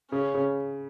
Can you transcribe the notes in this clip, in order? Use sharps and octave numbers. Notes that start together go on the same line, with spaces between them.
C#3 C#4
C#3